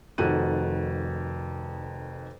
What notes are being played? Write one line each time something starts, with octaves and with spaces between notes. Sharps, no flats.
F1 F2 D#3 F#4 F#6 D#7